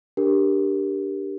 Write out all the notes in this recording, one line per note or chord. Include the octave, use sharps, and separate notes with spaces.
D4 G4 A#4